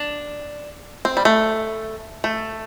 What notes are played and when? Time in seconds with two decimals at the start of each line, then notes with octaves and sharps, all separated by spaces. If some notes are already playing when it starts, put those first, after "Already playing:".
Already playing: D4
1.05 C4
1.17 G3
1.25 A3
2.24 A3